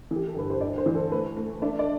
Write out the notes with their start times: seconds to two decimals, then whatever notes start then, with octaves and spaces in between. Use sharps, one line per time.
0.11 E3 G4
0.27 A4
0.35 G1 B4
0.50 C5
0.61 D2 D5
0.78 C5
0.86 E3
0.95 A4
1.12 A3 B4
1.37 A3
1.62 D4 E5
1.79 D5